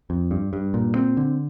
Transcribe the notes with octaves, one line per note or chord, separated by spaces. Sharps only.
F2
G2
G2
A#2
C4
D3